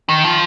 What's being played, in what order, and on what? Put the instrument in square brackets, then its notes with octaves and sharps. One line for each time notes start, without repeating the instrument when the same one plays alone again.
[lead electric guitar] D#3
F3